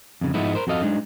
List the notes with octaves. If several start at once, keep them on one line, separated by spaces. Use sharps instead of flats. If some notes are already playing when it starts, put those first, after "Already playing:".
F2 C#3
G#2 F3 G#3 B3 D#4 E4
A#4 C5
F2 F#4 A4 D#5 F5
G#3 D4 D#4